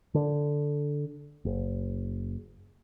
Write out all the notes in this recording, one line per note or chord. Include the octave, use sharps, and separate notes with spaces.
D3
F#1